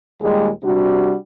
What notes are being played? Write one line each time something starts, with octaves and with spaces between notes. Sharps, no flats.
D#2 A#2 G3 G#3
C3 G3 D4 F#4